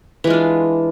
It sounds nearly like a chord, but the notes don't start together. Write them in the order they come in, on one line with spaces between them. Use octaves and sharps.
E3 G#3 F4 D4